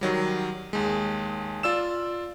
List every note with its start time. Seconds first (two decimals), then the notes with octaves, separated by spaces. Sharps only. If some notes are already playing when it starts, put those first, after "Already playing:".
0.01 D#3 F#3 G3
0.73 D#2 G#3
1.63 F4 D5 E6 E7